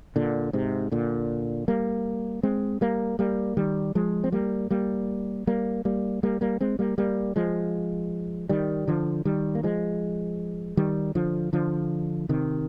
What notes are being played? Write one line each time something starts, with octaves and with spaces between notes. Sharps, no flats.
A#2 D3
G#2 C3
A#2 D3
G3 A#3
G#3 C4
G3 A#3
G3 A#3
D#3 G3
F3 G#3
C4
G3 A#3
G3 A#3
G3 A#3
G3 A#3
G3 A#3
G3 A#3
G#3 C4
G3 A#3
G3 A#3
F3 G#3
D#3 G3
D3 F3
D#3 G3
A#3
F3 G#3
D#3 G3
D3 F3
D3 F3
C3 D#3